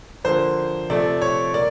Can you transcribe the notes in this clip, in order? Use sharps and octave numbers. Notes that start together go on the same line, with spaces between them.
D3 F3 A#3 C5
C3 F3 A3 D5
C#5
A#3 D5